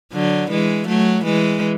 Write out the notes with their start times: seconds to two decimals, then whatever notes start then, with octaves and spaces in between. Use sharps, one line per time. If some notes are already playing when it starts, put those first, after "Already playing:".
0.13 D3 F#3
0.50 E3 G#3
0.87 F#3 A3
1.24 E3 G#3